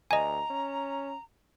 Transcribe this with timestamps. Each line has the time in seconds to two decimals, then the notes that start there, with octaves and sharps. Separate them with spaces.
0.11 D2 D#5 G#5 A#5
0.50 C#4